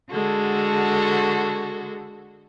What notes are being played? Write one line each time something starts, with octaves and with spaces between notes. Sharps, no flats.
D3 G#3 F#4 A4